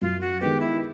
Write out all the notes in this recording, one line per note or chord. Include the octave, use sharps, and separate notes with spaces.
F#2 F4
F#4
D#3 G#3 B3 G4
E4